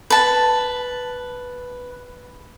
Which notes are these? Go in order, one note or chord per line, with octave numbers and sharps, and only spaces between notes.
B4 A5